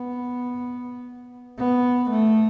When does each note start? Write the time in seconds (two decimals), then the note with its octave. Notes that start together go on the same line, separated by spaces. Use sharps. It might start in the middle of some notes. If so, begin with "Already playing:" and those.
Already playing: B3
1.58 B3
2.10 A3